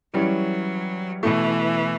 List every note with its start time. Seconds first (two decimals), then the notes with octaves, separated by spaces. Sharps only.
0.13 E3 F#3 G3 C#4 E4
1.23 B2 E3 A3 E4